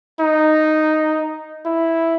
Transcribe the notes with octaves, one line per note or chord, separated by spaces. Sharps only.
D#4
E4